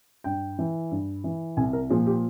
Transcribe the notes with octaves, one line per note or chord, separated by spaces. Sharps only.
G2 G5
E3
G2
E3
C2 G#5
A#4
A#2 F3 G#4
G4